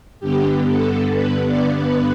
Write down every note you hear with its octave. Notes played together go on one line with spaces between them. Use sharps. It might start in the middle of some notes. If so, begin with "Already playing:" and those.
G2 D3 B3 G4
A4
B4
D5
B4